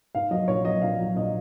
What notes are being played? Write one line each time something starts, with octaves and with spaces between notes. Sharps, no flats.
G#2 F5
F#3 D#5
A#1 C#5
F#3 D#5
A#1 F5
F#3
A#1 D#5